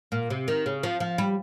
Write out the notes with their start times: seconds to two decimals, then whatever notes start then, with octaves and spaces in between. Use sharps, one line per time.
0.12 A#2
0.30 C3
0.48 D#3
0.66 C#3
0.83 F3
1.00 F3
1.18 G3